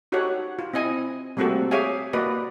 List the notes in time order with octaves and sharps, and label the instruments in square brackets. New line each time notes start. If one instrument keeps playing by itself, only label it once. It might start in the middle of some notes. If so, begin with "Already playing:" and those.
[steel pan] D#4 F#4 G4 A4 C#5 F#5
F4
C4 E4 D#5 G#5
G3 A3 A#3 C4 F#4 A4
G4 G#4 C#5 E5 F5 G#5
A#3 F#4 B4 D5 D#5